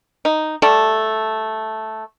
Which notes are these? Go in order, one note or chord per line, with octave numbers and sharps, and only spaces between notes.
D#4
G3 A3 A4 D5